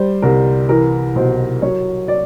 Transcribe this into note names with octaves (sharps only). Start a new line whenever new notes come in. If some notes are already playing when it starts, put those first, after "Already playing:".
Already playing: G3 C5
C2 A#4
E3 A#4
B1 C5
F#3 C#5
D5